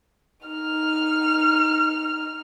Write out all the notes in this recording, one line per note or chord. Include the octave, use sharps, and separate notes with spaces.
D#4 F6